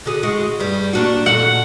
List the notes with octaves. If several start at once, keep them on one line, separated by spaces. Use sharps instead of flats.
D3 F#4 G#4
G#3 F#4
G2 G3
A#3 D4 F#4
A#2 F#4 A4 F#5